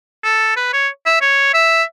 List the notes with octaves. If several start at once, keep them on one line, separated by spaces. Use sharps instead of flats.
A4
B4
C#5
E5
C#5
E5